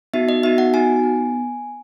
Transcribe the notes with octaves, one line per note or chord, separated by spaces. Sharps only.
B3 D#4 F#4 E5
D#5
B3 D#4 F#4 E5
F#5
B3 D#4 F#4 G#5
B3